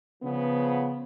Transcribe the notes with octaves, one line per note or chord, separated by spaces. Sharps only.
C#3 F3 B3